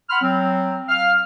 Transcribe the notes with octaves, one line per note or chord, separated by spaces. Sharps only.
F#5 B5 C6 F6
F#3 C4
F5 F6